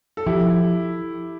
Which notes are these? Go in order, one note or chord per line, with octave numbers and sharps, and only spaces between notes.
A4
F3 E4 G4